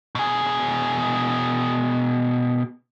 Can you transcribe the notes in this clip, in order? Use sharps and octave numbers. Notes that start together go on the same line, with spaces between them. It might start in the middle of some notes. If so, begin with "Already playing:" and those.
B2 G#4